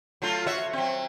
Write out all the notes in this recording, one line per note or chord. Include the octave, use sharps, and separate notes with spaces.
F#3 A3 F4
F#4 C#5 E5
F#3 C4